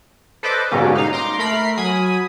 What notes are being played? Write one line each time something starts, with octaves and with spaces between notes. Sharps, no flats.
A4 B4 C5 D5 D#5 D6
G#2 B2 D3 G3 A#3 C#4
D#4 F5
A#5 C6 D6
A3 A#4 B5 C7
F#3 G#5 B5 D#6